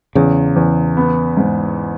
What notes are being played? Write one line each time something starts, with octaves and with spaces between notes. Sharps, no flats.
E2 C#3
E2
B3
G#2